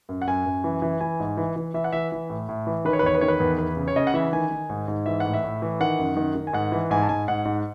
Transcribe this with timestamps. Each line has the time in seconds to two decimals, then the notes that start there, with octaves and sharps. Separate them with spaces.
0.09 F#2
0.22 F#5
0.27 F#2 G#5
0.46 F#2
0.64 E3
0.82 E3
1.01 E3 G#5
1.20 G#2
1.37 E3
1.56 E3
1.74 E3 E5
1.84 F#5
1.93 E3 E5
2.12 E3
2.30 A2
2.49 A2
2.67 E3
2.85 D#3 B4
2.93 C#5
2.99 B4
3.03 E2 C#5
3.15 B4
3.21 D#3 C#5
3.28 B4
3.40 E2
3.58 E2 B4
3.77 C#3
3.88 C#5
3.96 C#3 D#5
4.07 F#5
4.14 E3 E5
4.33 D#3 G#5
4.51 D#3
4.70 G#2
4.88 G#2
5.06 E3 E5
5.20 A2 F#5
5.34 E5
5.44 A2
5.62 E3
5.80 D#3 F#5
5.99 F#2
6.17 D#3
6.35 D#3
6.47 G#5
6.53 G#2 F#5
6.72 E3
6.91 G#2 G#5
7.03 A5
7.09 G#2 G#5
7.28 G#2 F#5
7.45 G#2